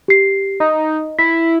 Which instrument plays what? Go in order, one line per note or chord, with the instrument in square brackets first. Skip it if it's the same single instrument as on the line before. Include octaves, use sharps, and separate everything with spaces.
[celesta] G4 C7
[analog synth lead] D#4 [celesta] D#5
[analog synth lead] E4 [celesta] B6